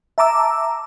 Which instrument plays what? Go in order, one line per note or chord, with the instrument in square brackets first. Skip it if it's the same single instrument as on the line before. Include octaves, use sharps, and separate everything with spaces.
[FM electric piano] E5 A5 A#5 D6 E6